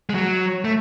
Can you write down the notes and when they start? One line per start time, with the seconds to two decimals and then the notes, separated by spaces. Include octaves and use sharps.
0.10 G#3
0.15 F#3
0.65 A3